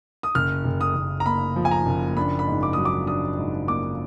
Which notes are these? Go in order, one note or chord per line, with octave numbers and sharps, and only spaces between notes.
D#6
F#1 F6
F#1
D#6
F#1
A#5
A#3 B5
F3
G#5
A#5
F#1
D4 B5
B5
G#2
D6
F#3 D#6
D6
D4 D#6
G#2
A#3 D6